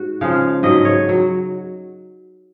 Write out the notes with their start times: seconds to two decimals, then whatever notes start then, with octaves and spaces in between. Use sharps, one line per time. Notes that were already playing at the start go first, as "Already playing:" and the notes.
Already playing: G#2 F#4
0.21 C#3 F3 G#3 F5
0.63 G#2 F#3 D#5
0.85 C#5
1.09 F#3